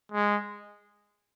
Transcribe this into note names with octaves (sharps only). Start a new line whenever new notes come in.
G#3